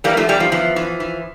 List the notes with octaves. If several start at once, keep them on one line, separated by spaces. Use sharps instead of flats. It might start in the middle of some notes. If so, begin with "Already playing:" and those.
E3 G3 A#3
F3 A3
E2 G3
F3
E3 F3
E3
E3